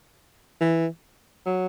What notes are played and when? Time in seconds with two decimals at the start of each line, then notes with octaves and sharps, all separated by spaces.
0.61 E3
1.46 F#3